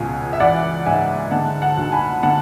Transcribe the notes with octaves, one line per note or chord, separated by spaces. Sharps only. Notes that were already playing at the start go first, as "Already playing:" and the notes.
Already playing: C#2 B2 G#5
E5
E3 D5 F#5
G#2 E5 G#5
D3 F#5 A5
F#5 A5
D2
A5
G#5 B5
D3 F#5 A5